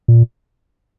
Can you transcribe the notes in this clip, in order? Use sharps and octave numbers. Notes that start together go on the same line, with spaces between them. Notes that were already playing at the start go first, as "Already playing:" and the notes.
A#2